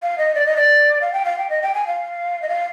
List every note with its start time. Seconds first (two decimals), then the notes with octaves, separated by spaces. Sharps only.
0.03 F5
0.18 D#5
0.35 D5
0.46 D#5
0.56 D5
1.01 F5
1.13 G5
1.25 F5
1.39 G5
1.50 D#5
1.62 G5
1.75 G#5
1.87 F5
2.42 D#5
2.49 F5